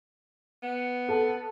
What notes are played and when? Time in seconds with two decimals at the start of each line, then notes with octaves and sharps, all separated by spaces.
0.63 B3
1.09 A4